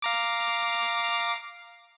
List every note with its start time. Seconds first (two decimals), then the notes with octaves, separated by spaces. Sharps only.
0.02 F5 A#5 D6